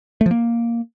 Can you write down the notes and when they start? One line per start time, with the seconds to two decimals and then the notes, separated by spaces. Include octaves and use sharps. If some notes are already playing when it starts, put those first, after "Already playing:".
0.21 A3
0.26 F3
0.31 A#3